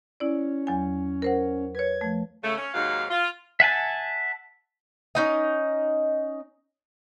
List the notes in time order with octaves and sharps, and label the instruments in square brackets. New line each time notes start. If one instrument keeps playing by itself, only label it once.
[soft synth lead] C#4 [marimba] E4 D5
[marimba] E2 F#3 G#5
A#4 C5 F#5
[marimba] B4 C#5 [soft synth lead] G#6
[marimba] F3 A3
[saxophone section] C#3 A3
C#4
D#2 G#2 F#3 D#4 F5
F4
[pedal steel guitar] E5 F#5 G#5 A5
[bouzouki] C#4 D#4 D#5